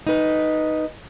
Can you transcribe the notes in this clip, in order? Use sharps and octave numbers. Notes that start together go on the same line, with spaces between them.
D#4 B4